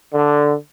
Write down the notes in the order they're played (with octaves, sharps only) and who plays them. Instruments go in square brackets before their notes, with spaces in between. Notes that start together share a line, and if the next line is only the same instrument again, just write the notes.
[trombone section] D3